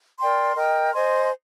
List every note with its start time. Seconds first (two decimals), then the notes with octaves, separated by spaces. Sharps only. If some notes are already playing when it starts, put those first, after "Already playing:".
0.19 A#4 D5 G5 C6
0.56 A#4 D#5 G5
0.93 C5 D#5 G#5 C6